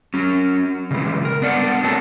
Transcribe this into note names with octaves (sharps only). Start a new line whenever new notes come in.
F#3 C#4
C#3 E3 G#3
A#4
B3 D4 D5 F#5
A3 C4 A4 A#4 C#5 A5